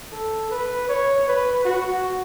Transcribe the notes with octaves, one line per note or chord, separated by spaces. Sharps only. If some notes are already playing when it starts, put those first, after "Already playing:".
A4
B4
C#5
B4
F#4